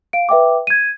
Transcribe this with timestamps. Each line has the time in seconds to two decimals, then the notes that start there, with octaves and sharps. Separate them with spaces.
0.13 F5 D7
0.29 B4 E5 G5 D6
0.67 G#6 D#7